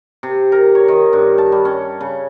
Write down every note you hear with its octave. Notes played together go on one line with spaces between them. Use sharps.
C3
A#4
C#5
D#3
G2
A5
G3
C#4
C#3